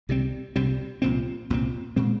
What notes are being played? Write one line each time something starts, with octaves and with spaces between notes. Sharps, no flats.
C2 C3 G3 C4
C2 C3 G3 C4
C2 A#2 F3 C4
C2 A#2 F3 C4
A#2 G#3 C4